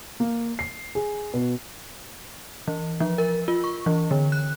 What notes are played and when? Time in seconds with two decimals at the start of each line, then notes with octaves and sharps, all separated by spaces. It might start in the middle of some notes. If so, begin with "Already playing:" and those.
0.20 A#3
0.59 C7
0.95 G#4
1.34 B2
2.68 E3
3.00 F3
3.18 A#4
3.48 F4
3.64 C#6
3.86 E3
4.11 D3
4.32 F#6